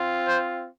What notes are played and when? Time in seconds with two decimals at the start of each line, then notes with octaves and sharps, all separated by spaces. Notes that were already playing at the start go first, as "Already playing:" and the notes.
Already playing: C4 F4
0.26 C5